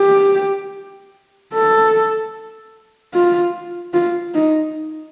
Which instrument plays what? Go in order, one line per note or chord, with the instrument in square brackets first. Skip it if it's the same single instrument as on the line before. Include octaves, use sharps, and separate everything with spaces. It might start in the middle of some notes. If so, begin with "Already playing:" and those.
Already playing: [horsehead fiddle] G4
A4
F4
F4
D#4